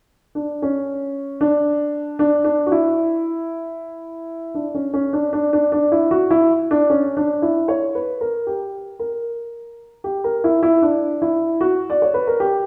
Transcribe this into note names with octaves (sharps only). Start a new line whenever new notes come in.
D4
C#4
D4
D4
D4
F#4
E4
D4
C#4
C#4
D4
D4
D4
D4
E4
F#4
E4
D4
C#4
D4
E4
C#5
B4
A#4
G4
A#4
G4
A#4
E4
E4
D4
E4
F#4
D5
C#5
B4
A#4
G4